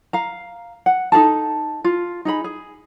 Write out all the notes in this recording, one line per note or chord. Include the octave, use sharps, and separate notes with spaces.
F5 A#5
F#5
D#4 G#4 A4 A5
F4
D#4 G#4 B5
G#4